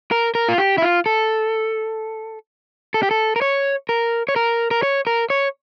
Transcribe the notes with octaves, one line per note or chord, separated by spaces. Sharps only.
A#4
A#4
F4
G4
E4
F4
A4
A4
G4
A4
A#4
C#5
A#4
C#5
A#4
A#4
C#5
A#4
C#5